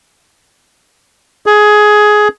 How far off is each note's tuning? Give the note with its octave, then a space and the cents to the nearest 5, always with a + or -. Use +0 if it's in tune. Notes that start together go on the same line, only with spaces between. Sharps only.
G#4 +15